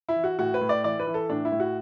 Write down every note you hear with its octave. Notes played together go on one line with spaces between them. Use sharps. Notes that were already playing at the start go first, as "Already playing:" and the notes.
E4
E3
F#4
A2 F#4
B4
A2
D5
E3 D5
B4
E3
A4
A2 D4
E4
A2
F#4